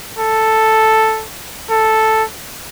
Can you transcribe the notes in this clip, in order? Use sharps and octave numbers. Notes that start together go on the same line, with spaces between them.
A4
A4